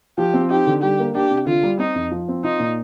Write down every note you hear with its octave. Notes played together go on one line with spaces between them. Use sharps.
F3 G4
C4
D#4 G4
D3
G3 G4
A#3
D4 G4
C3
D3 F4
G3
C4 D#4
F2
F3
C4
D#4 F4
A#2